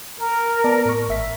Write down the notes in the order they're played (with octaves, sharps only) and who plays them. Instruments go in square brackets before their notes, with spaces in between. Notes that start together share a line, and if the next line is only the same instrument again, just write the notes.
[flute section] A#4
[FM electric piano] B3 D5 A5
A2 C#6
G#1 E5 B6